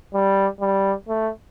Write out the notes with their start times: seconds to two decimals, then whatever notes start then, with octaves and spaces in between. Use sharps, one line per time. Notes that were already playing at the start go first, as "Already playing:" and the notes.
0.14 G3
0.61 G3
1.08 A3